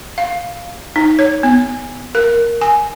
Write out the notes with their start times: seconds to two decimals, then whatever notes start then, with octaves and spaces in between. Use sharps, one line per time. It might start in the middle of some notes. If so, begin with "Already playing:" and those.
0.18 F5
0.96 D#4
1.19 C#5
1.43 B3
2.15 A#4
2.61 G#5